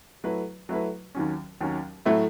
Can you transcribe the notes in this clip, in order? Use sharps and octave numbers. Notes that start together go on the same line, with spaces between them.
F#3 A3 E4 B4
F#3 A3 E4 B4
D#2 D#3 F#3 C#4
D#2 D#3 F#3 C#4
A2 F#3 A3 E4